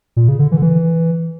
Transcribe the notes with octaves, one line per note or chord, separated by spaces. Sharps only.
A#2
C#3
D3
E3
D3
E3